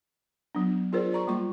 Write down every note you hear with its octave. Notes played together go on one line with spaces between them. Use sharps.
F#3 B3 D4
D4 F4 G#4 A#4 C5 D5
C5 D5 A#5 C#6
G3 A#3 F4 C#6